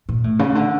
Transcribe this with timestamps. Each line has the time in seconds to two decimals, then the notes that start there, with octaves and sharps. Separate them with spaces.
0.09 A#2
0.24 A2
0.39 C#3
0.55 D3